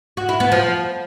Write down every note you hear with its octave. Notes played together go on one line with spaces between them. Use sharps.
F#4
E4
B3
F3